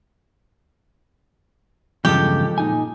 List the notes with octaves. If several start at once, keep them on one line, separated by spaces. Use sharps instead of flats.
E2 G2 C#3 F3 G#3 G4 A4
A#2 D#4 G#5